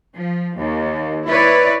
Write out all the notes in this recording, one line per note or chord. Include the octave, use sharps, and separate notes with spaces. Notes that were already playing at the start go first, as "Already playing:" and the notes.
F3
D#2
E4 B4 C#5 D5